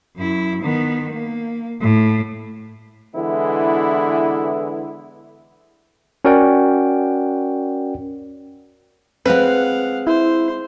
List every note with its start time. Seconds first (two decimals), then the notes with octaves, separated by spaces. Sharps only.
0.17 F#2 E4
0.62 D#3 B3
1.13 A#3
1.82 A2
3.16 D3 E3 G#3 B3 E4
6.25 C#4 F#4 A#4 D5 F#5 G5
9.26 G#3 C4 B4 F5 F#5
10.07 E4 C5